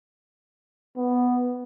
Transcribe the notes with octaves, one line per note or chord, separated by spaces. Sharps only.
B3